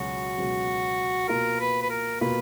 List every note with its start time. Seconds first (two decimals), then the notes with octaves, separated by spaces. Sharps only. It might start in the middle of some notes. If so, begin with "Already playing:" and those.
Already playing: C#2 B2 F#3 C#4 F#4 G#4
0.37 C#2 B2 F#3 C#4 G#4
1.28 B2 A#3 F4 A#4
1.60 B4
1.82 B4
1.90 A#4
2.21 B2 A#3 F4 B4